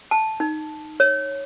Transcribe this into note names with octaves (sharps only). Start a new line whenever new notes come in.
A5
D#4
C#5